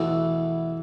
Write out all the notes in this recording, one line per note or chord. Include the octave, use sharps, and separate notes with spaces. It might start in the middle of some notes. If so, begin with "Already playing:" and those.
Already playing: E2 B2 E3 A3